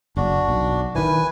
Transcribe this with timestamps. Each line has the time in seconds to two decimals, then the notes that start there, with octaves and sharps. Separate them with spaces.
0.17 F#1 D4 F#4
0.48 B1
0.95 D#3 E3 B4 G#5